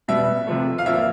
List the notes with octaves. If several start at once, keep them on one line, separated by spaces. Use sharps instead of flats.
B2 G3 B3 E5
C3 F3 A3
F5
A#2 F3 A#3 E5